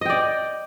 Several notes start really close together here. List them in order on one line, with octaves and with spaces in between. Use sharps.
D#5 G5 D5